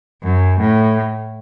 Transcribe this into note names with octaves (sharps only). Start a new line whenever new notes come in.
F#2
A2